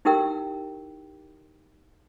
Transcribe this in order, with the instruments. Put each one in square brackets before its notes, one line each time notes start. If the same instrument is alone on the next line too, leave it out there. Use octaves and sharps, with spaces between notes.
[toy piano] D#4 E4 G4 A#4 G5 E6